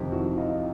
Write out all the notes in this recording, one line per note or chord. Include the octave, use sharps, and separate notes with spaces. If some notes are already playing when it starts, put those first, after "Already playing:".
Already playing: F2 C3 D#3
E4 F#4
D#4 F4